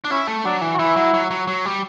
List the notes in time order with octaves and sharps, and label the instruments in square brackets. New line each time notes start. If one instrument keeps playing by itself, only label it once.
[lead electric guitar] D4
[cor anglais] C#4 [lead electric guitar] E4
[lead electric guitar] A3
[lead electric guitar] F#3 [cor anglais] D4
[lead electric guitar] E3
[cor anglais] F#4
[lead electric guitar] E3 [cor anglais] E4
[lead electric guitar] F#3
F#3
F#3
F#3
G3